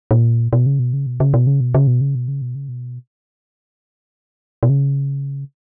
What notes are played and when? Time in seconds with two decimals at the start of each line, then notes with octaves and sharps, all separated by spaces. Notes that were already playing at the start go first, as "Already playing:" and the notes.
0.11 A#2
0.53 B2
0.66 C#3
0.79 B2
0.93 C#3
1.07 B2
1.20 C#3
1.34 B2
1.47 C#3
1.60 B2
1.74 C#3
1.87 B2
2.01 C#3
2.15 B2
2.28 C#3
2.42 B2
2.55 C#3
2.69 B2
4.63 B2
4.69 C#3